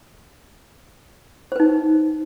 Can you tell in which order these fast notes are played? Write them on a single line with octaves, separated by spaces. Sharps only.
C5 B4 D#4